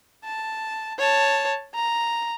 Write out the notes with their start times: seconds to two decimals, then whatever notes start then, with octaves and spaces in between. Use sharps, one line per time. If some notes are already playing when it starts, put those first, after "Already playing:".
0.25 A5
0.99 C#5 A5
1.75 A#5